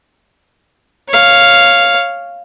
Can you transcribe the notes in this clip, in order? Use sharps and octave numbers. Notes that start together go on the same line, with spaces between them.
C#5 F5